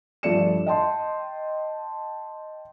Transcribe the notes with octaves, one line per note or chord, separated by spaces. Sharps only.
G2 F3 A3 D5 C#7 E7
D#5 G5 A5 C6